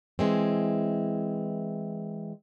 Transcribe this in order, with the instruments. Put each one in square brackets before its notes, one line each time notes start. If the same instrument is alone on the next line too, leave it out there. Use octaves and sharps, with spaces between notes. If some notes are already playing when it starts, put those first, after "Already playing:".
[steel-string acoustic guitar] E3 G#3 C4